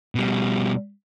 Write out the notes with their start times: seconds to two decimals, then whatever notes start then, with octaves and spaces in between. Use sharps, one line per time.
0.15 B2 G3